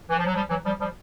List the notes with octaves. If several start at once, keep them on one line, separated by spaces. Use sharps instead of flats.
E3
F3
F#3
F3 G3
E3 F#3
F3 G3
F3 G3